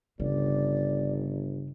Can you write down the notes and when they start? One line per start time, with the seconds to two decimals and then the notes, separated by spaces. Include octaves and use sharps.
0.20 G1 C#3 D5